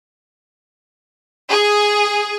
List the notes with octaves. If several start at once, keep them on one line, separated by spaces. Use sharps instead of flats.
G#4